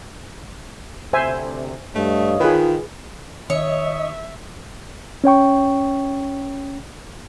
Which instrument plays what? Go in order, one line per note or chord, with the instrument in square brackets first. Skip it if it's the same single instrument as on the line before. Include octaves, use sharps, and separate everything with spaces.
[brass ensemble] D2 C3 [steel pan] C5 E5 G#5
[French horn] G2 [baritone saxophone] A3 [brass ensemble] C#5 D#5 F5
[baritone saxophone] D#3 [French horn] F4 [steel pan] G#4 B4
[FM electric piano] D#3 [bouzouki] C#5 [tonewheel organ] D#5 [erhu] E5
[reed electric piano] C#4 C#5 G5 C#6